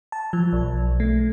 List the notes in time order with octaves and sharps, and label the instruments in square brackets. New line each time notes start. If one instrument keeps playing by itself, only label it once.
[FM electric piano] A5
F3
B1
A3